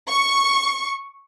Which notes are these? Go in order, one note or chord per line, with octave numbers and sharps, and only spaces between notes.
C#6